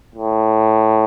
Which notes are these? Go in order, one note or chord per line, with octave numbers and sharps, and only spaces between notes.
A2